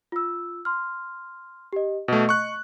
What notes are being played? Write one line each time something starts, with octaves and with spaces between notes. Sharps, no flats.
F4 E6
C6 F6
G4 D#5
B2 A3 D#5
C#6 F#6